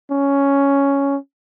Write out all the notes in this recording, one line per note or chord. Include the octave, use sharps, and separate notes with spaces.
C#4